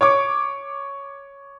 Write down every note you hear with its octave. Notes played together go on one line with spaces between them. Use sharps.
C#5 C#6 D6